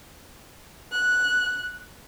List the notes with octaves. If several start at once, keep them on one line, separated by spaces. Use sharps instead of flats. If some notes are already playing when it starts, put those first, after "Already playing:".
F#6